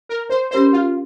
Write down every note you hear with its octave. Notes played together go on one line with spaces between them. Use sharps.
A#4
C5
C#4 G4 A#4 C5 C#5
F4